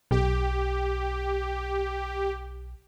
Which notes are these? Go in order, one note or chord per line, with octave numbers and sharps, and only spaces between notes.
B1 G4